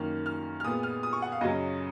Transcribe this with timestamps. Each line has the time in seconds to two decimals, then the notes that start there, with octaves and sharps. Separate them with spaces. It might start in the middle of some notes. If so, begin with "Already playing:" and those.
Already playing: F#2 D#3 A#3 F6
0.26 F6
0.60 F6
0.64 A#2 G#3 B3 D#6
0.83 F6
1.03 D#6
1.13 C#6
1.22 F#5
1.32 F5
1.41 F#2 C#3 F#3 C#4 D#5